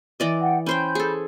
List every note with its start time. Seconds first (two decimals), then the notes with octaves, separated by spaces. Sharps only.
0.20 E3 D5 D#5
0.41 F#5 G5
0.66 C#4 C5 G5 B5 G6
0.95 G#4 A4